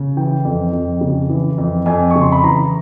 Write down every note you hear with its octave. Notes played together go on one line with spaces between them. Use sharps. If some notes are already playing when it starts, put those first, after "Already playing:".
Already playing: C#3
E3 G5
F2
F2
C#3
E3
F2
F2 G#5
C#3 C#6
C6
B5
E3 A#5